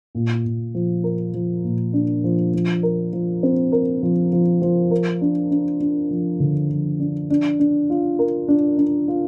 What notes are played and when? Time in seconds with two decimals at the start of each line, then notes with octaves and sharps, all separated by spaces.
0.15 A#2
0.45 A#2
0.74 F3
1.04 A#4
1.34 F3
1.64 A#2
1.93 D4
2.24 F3
2.54 F3
2.83 A#4
3.13 F3
3.43 C4
3.72 A#4
4.03 F3
4.33 F3
4.62 F3
4.91 A#4
5.21 D4
5.51 D4
5.80 D4
6.10 F3
6.40 D3
6.70 F3
7.00 D4
7.30 D4
7.59 D4
7.90 F4
8.19 A#4
8.48 D4
8.78 D4
9.08 F4